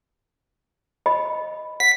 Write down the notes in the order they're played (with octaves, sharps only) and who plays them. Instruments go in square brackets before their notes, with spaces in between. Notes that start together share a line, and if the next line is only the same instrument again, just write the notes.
[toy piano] D#5 B5
[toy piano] F#5 [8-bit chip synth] B6